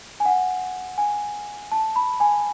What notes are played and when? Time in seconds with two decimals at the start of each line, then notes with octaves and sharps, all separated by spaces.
0.20 G#5
0.25 F#5
0.98 G#5
1.72 A5
1.96 B5
2.20 G#5